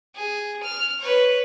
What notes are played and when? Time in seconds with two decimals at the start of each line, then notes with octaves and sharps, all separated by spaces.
0.15 G#4
0.62 F6
1.00 B4 C#5